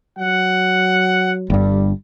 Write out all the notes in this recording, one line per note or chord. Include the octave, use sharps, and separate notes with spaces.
F#3 F#5
G1 G2 G3